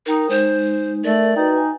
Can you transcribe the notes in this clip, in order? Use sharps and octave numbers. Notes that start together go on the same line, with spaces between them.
D#4 A#4 G5 D#6
G#3 D#4 C5
A3 A#4 D5
D#4 F#4 B4 G5
G#5